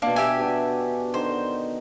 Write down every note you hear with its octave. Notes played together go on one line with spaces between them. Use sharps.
B2 A#3 D4 D5
G4 E5 G#5
D4 F#4
D3 D#3 C5 D#5